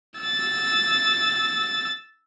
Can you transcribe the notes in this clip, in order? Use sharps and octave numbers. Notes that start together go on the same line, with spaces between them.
E6 A6